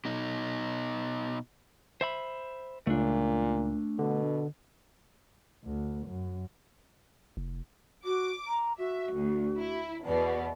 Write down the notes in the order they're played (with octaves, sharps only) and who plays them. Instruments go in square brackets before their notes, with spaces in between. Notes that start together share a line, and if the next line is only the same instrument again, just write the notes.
[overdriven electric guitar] B2 D#4
[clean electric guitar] C5 E5 B5
[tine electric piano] C#2 [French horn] A#2 [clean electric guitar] A3 D4
[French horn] B2 [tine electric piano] D3
[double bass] D2
F#2
[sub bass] F1
[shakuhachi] F#4 [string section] D6
[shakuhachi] A#5
[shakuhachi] F#4 [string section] E5
[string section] D2
E4
[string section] E2 B2 [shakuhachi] D5